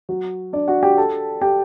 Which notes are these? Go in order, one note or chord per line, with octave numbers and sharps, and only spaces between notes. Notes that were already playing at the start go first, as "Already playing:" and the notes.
F#3 F#4
D4 D5
F#4 F#5
G4 G5
A4 A5
G4 G5